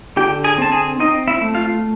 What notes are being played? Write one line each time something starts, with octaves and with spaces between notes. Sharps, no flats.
D3 G4 G5
G#4 G#5
C4 A5
G#4 G#5
C4 D#4 D#5
E4 E5
A3
F4 F5